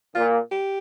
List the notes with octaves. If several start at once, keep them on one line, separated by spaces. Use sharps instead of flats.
A#2 F4
G4